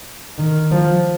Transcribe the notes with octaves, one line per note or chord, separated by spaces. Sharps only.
D#3
F3